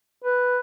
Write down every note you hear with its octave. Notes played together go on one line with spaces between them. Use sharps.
B4